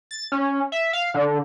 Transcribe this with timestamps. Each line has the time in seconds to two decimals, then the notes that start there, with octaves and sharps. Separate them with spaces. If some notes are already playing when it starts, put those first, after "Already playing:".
0.11 A6
0.32 C#4
0.72 E5
0.93 F5
1.14 D3